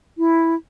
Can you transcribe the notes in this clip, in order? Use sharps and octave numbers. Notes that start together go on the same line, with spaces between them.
E4